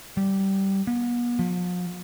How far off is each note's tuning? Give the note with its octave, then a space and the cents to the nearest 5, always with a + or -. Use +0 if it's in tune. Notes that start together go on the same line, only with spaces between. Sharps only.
G3 -15
B3 -40
F3 +40